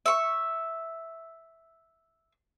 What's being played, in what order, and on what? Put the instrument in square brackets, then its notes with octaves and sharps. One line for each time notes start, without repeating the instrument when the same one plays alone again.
[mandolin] E5 C#6